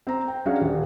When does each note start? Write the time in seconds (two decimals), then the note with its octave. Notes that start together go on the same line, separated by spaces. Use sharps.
0.07 C4 A#5
0.28 G5
0.46 F#3 C#4 D4 F#4 G#4 F5
0.60 D#1